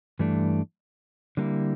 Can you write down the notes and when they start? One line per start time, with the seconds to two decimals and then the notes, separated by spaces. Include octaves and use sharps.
0.19 G2 E3 A3 D4
1.37 D3 G3 A#3 E4